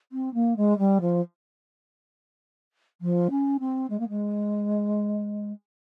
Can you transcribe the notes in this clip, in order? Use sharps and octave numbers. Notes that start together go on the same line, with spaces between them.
C4
A#3
G#3
G3
F3
F3
C#4
C4
G#3
A#3
G#3